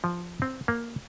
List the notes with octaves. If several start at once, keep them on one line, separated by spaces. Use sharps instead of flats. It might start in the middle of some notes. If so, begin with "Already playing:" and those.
F3
C4
A#3